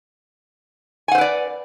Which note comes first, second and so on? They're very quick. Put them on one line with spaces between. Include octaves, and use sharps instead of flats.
G#5 F#5 C5 B4 D5